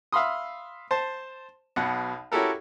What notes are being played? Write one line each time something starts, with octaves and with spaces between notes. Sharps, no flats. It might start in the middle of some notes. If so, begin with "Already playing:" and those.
E5 F5 B5 C6 D#6
C5 A5
B1 B2 F#5
C#4 E4 F#4 G4 A4 A#4